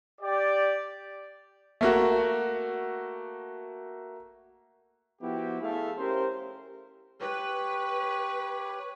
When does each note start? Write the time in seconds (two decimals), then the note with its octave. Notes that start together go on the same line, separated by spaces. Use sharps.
0.21 G4 D5
1.81 A3 A#3 F#4
5.22 F3 B3 E4 F#4 G4
5.62 A3 E4 G#4 A4 E5 F5
5.98 C#4 G4 A#4 C5
7.21 G4 B4 C#5